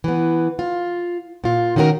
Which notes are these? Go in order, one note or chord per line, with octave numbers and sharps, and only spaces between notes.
E3 B3
F4
A#2 F4
D#3 C#4 F#4 G#4 A#4